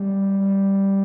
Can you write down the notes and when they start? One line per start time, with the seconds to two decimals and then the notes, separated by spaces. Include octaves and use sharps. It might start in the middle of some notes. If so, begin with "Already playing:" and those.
Already playing: G3
0.39 G3